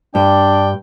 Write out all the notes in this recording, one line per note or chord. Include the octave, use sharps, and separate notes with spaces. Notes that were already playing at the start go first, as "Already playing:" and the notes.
G2 D4 D5 G5